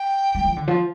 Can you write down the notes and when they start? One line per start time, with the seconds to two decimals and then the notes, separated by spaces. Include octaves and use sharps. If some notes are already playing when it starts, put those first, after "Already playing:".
Already playing: G5
0.35 G3
0.45 F3
0.56 D3
0.68 F3